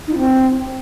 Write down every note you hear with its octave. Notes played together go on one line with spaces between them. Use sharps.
D#4
F4
C4